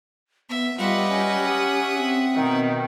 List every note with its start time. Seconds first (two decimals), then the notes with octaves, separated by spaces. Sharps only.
0.50 B3 E5
0.79 G3 F4 G4 B4 D#5 E5 F#5
1.09 C#4
1.45 G4 D#6
1.98 C4
2.35 B2 D#3 D#4